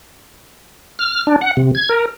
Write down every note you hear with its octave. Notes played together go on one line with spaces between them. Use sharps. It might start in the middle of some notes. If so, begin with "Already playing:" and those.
F6
D4
F#5
C3
G#6
A#4